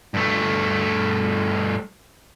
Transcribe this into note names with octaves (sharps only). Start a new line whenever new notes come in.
G2 A3